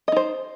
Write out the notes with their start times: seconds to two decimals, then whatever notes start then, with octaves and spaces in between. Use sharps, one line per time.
0.08 D#5
0.12 D#4
0.16 C5